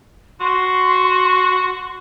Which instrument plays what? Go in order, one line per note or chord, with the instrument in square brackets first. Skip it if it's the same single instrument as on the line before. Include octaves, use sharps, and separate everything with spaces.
[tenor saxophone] F#4 [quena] C6